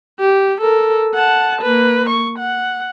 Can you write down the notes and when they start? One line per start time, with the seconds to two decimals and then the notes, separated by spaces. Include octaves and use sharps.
0.19 G4
0.61 A4 A#4
1.14 F#5 A5
1.61 A#3 B4
2.09 C#6
2.39 F#5